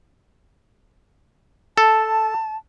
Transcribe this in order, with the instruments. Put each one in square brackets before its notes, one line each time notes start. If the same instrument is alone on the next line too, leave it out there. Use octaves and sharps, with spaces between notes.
[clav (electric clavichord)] A4 [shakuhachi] A5